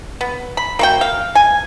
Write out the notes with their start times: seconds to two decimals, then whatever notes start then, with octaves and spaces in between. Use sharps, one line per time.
0.21 B3
0.57 B5
0.79 A#3 F#4 G5
1.01 F5
1.35 G#5